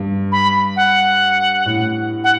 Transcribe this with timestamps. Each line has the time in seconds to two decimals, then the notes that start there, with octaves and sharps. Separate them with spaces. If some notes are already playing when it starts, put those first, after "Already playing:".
Already playing: G2
0.32 B5
0.76 F#5
1.66 A2
2.24 F#5